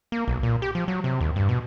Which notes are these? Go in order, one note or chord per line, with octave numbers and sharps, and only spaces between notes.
A#3
B1
A#2
G4
F3
F#3
C3
D#2
G2
B2